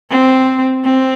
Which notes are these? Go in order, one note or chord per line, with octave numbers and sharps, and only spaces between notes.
C4
C4